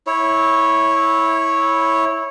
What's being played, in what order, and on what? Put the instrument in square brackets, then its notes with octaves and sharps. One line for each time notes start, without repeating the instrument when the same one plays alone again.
[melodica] E4 C#5